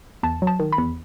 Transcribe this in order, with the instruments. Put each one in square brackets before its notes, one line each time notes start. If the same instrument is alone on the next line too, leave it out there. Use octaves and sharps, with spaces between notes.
[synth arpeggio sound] E2 A5
F#3
A5
D#3
B5
E2